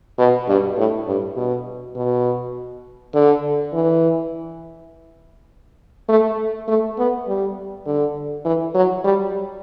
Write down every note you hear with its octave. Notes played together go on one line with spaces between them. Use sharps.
B2
G2
A2
G2
B2
B2
D3
E3
A3
A3
B3
G3
D3
E3
F#3
G3